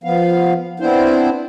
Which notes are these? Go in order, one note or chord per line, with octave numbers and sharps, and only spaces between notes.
F3 B3 F5
B3 C4 D4 E4 C5